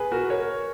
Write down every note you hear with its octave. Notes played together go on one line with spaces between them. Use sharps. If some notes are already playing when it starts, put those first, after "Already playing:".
Already playing: G#4 B4
F#4 A#4
A#4 C#5